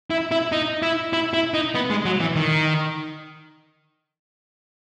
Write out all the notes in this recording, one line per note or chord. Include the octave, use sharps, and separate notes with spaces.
E4
E4
D#4
E4
E4
E4
D#4
B3
G#3
F#3
E3
D#3